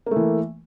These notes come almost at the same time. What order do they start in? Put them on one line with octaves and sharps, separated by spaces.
A#3 A3 E3